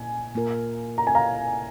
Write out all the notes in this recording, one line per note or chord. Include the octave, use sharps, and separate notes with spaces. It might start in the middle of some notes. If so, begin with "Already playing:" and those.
Already playing: A#2 A#3 G#5
A#2 A#3 F4 A#4
A#5
G#5
F5 A#5